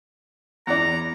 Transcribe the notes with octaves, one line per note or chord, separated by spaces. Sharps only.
E2 D5 A#5